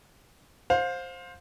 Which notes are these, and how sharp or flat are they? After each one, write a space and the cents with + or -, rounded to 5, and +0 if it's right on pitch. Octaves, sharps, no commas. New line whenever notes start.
C5 +10 F5 +30